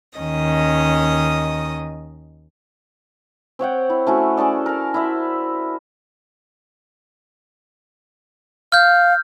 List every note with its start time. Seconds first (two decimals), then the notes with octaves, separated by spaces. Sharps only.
0.18 D#2 D#3 C#4 D#5 D#6
3.59 C4 C#5 F#5 G5
3.90 E4
4.07 A3 C#4 E4 F#4
4.37 C#4 G#4 A4 D5
4.66 A#4 A5
4.94 E4 C5 D5 E5
8.72 F5 F6 G6